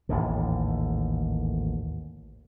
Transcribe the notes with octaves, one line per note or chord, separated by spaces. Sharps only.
A1 D#2 G#2 D3